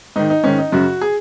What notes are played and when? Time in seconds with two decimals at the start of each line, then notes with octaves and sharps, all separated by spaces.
0.16 G#2 D#3 D#4
0.30 D#4
0.44 G#2 D#3 C#4
0.59 D#4
0.72 F#2 C#3 F#4
1.01 G#4